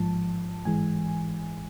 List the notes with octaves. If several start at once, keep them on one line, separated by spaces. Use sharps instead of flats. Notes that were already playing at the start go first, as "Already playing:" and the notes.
Already playing: A1 G#2 F3 A5
A1 G#2 E3 G#3 G#5